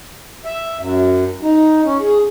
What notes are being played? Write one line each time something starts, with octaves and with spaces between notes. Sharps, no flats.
E5
F#2
D#4
C#4
G#4